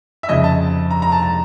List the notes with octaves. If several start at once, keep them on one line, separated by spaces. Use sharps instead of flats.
E5
F2 C#3 F3 D#5
A5
A#5
A#5
A5
A5